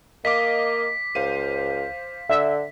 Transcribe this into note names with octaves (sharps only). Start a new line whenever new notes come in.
A#3 D#5 F5 D6 B6
C#2 C5 F5 D#7
D3 E5